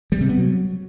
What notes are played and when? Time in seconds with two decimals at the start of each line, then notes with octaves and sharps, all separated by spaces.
0.12 G3
0.20 C3
0.29 B3
0.38 F#3